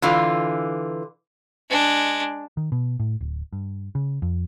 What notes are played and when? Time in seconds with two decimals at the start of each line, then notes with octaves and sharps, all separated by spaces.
0.02 D3 E3 F4
1.69 G#3 D4
2.57 D#3
2.72 B2
3.00 A2
3.21 D1
3.53 G2
3.95 C#3
4.22 F2